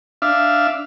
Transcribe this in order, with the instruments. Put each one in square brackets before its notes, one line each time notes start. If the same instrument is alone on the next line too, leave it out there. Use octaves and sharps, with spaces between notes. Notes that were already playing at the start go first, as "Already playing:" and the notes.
[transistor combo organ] D4 E5 F5